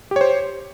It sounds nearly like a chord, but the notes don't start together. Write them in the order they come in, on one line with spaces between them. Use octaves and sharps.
G4 C#5 C5